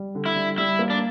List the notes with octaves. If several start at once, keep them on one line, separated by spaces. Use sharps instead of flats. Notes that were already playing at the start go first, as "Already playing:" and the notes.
Already playing: G3
D3
E4
G3
G3 E4
A#3
D4